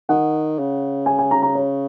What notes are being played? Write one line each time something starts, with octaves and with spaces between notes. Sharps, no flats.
D#3 F#5
C#3
G#5
G#5
A#5
A#5
C#5